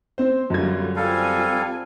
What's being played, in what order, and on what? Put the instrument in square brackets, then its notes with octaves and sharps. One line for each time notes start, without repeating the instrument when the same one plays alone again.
[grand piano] C4 C5
[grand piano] F#2 G#6 [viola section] D3 G3 F4
[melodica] G3 A4 F5 [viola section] C4 F4 G#5